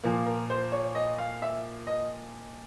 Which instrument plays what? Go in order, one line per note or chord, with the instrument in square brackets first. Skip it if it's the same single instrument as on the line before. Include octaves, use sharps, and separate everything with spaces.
[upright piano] A#2 F3 A#3
A#4
C5
C#5
D#5
F5
E5
D#5